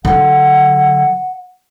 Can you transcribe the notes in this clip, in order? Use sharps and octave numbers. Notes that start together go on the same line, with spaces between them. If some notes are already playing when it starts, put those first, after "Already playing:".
D3 F#3 F#5